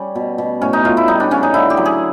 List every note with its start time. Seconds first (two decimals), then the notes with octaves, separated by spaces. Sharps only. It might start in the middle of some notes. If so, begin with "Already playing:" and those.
Already playing: G3 C#4
0.15 B2
0.38 B2
0.61 A2 C#4
0.73 D#4
0.85 A2 F4
0.97 E4
1.08 G3 D#4
1.20 D4
1.31 C#3 C#4
1.43 D#4
1.54 D3 E4
1.70 G4
1.77 F#3
1.85 G#4